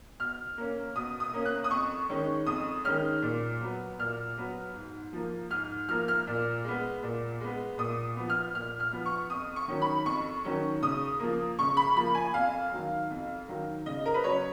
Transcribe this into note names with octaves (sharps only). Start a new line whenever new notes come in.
B2 F6
A#3 C#4
B2 D#6
D#6
A#3 C#4
F#6
D#6
F2 C#6
D#3 G#3 C#4
F2 D#6
D#3 G#3 C#4 F6
A#2
F#3 B3
A#2 F6
F#3 B3
G#2
F3 A#3
G#2 F6
F3 A#3 F6
F6
A#2
G#3 B3
A#2
G#3 B3
A#2 D#6
F3 B3
F6
A#2 F6
F6
F3 B3
C#6
F2 D#6
C#6
D#3 F#3 C#4
B5
F2 C#6
D#3 F#3 C#4
C#3 D#6
F3 A#3
C#3 C#6
B5
F3 A#3 B5
G#5
F2 F5
D#3 F#3
F2
D#3 F#3
C#3 D#5
A#4
B4
F#3 C#4 C#5